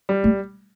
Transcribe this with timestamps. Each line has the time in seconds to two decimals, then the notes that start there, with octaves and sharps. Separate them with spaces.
0.09 G3
0.24 A3